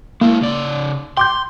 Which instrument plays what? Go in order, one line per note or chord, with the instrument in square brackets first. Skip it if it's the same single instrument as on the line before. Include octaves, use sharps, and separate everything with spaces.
[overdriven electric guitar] G#3 E4 [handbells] A#3
[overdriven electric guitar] C#3 D5
[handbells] G5 D6 G6 [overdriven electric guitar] C6